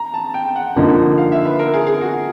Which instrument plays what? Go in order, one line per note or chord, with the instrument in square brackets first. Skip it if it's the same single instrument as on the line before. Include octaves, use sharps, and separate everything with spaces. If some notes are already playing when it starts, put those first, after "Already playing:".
Already playing: [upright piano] A#5
A5
G5
F#5
[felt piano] D3 F3 A#3 D#4
[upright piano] F5
E5
B4
A#4
G#4
G#4
F#4